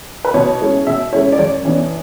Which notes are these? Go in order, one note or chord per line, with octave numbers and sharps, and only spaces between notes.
B4
B2 C#5
G#3 C#4 E4
B2 E5
G#3 C#4 E4 C#5
D5
F#2 C#5
E3 B3 D4